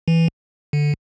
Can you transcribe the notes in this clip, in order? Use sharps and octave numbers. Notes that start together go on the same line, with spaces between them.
E3
D3